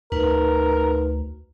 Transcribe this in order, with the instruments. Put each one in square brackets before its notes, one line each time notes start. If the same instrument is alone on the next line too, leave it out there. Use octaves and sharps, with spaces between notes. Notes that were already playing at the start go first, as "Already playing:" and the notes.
[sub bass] D2 [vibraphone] D#4 B4 [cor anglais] A#4